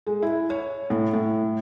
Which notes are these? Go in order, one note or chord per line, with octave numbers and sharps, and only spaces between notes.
G#3
E4
C#5
A2
A2